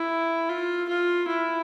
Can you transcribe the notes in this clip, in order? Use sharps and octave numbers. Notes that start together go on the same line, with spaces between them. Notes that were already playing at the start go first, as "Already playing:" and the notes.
Already playing: E4
F4
F4
E4